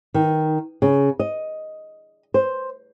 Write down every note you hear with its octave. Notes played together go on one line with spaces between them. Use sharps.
D#3
C#3
D#5
C5